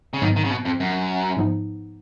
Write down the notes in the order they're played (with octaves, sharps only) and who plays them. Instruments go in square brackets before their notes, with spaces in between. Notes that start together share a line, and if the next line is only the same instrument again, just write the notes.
[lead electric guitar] C#3
[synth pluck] G#2 F#3 B3 [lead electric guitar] D#3
[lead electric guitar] D#3
C#3
B2
F2
F#2
[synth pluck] G#2 F3 B3 D#4